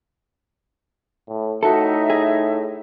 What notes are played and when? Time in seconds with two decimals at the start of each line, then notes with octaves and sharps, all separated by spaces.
1.28 A2
1.63 A2 D#4 F#4 A4 E5
2.10 G#4